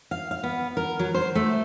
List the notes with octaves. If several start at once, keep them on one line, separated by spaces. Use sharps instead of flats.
F5
F5
B3
A#4
F#3
C5
A3